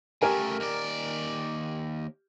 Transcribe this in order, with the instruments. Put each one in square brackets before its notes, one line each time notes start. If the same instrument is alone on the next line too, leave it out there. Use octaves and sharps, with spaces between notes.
[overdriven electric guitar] C#3 A3 [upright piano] G4 A#4 G#5
[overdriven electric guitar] D#2 D5